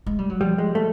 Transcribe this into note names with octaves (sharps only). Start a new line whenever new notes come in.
G#3
G3
F#3
F3 G3
G#3
A3